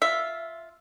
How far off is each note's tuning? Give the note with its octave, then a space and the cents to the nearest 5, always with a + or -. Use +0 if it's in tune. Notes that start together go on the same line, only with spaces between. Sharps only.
F4 +0 E5 +0